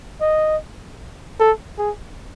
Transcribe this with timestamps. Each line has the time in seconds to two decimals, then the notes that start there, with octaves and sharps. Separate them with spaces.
0.21 D#5
1.40 A4
1.79 G#4